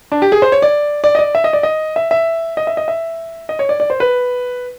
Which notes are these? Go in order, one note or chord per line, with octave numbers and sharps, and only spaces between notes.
D4
G4
G#4
C5
C#5
D5
D5
D#5
D5
E5
D#5
D5
D#5
E5
E5
D#5
E5
D#5
E5
D#5
C#5
D5
D5
C5
B4